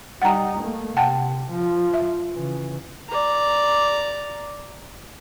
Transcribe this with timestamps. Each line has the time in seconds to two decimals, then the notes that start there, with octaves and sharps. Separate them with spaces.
0.22 G3 D#4 F#5 G5 A#5
0.60 A3 A#3
0.97 C3 F#5 G5 A5
1.51 F3
1.94 E5
2.32 C#3 E3
3.09 D5 A#5